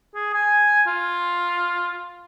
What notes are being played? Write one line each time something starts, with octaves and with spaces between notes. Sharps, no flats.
G#4
G#5
F4